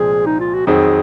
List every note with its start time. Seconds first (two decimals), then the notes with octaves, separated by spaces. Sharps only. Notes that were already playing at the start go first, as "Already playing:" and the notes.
Already playing: C2 A#2 F3 G#3 C4 G#4
0.26 D#4
0.40 F4
0.54 F#4
0.67 F2 D#3 F#3 C4 G#4